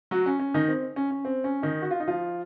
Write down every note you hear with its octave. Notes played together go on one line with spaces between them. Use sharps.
F#3 F#4
C#4
C#4
D#3 D#4
C4
C#4
C#4
C4
C#4
D#3 D#4
F#4
F4
D#4
F3 F4